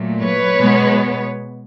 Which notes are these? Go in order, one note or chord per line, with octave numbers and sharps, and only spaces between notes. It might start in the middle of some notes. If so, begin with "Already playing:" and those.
Already playing: A#2 F#3 A3
B4 C#5
B2 G#3 B3